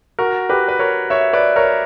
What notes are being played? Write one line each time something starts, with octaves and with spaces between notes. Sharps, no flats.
F#4 A#4
G4 B4
B4
A#4 C#5
C#5 E5
B4 D5
A#4 C#5